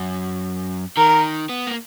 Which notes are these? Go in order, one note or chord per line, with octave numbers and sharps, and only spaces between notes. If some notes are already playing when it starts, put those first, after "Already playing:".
Already playing: F#2
D#3 A#4
B3
A#3